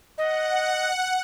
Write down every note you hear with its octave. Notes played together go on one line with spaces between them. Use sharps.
D#5 F#5